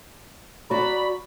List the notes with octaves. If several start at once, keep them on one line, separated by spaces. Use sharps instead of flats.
F#4 D5 A#5 B5